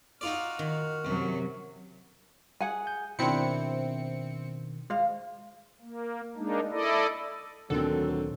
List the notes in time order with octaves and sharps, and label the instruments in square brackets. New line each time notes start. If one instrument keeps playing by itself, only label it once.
[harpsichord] D#4 F4 D5 [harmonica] F#4 F6
[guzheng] D#3
[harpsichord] F#2 [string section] C3 F#3
[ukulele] G#4 F#5 G#5
[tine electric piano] G6
[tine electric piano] B2 D#3 [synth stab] C4 C#7 [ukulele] D4 E4
[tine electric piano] G#3 [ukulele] C5 F5
[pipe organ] A#3
G#3 A#3 D4 D#4
E4 A4 D5 D#5
[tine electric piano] D2 A#2 D#3 [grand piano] D3 C4 [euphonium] F#3 [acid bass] A4